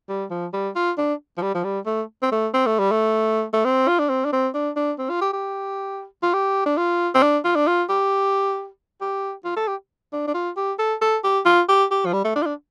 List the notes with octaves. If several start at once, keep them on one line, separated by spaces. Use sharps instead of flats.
G3
F3
G3
F4
D4
F3
G3
F3
G3
A3
C4
A3
C4
A3
G3
A3
A3
C4
F4
D4
C4
D4
C4
D4
D4
C4
F4
G4
G4
F4
G4
D4
F4
C4
D4
F4
D4
F4
G4
G4
F4
A4
G4
D4
D4
F4
G4
A4
A4
G4
F4
G4
G4
F3
G3
A3
D4
F4
D4